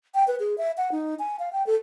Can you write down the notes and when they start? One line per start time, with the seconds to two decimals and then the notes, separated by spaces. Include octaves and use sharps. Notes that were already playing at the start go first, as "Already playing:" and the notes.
0.15 G5
0.28 B4
0.40 G#4
0.58 E5
0.78 F#5
0.92 D#4
1.19 G#5
1.39 F5
1.53 G5
1.67 A4